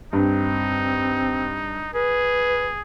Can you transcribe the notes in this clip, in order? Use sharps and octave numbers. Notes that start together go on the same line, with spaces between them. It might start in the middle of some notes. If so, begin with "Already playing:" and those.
G2 C4 D#4
G#4 B4